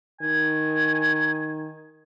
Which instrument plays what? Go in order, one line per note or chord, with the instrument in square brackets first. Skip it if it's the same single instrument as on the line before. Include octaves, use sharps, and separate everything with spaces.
[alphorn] D#3 [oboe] G#5